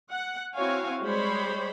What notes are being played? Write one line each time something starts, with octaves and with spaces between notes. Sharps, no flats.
F#5
C4 E4 F#4 C#5 F5 G#5
G3 G#3 C5 C#5 B5